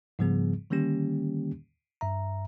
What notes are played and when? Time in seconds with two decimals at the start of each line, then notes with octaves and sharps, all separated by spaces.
0.19 G#2 C#3 F3 G3 B3 G#4
0.70 D3 D#3 G3 A#3 C#4 G4
2.01 G2 E5 A#5